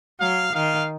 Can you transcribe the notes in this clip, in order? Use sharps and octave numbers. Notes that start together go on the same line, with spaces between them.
F#3 F5
D#3 F5